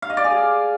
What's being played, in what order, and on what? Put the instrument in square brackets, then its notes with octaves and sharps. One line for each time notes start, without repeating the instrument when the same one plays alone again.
[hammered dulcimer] F5
D#5
D5
G#4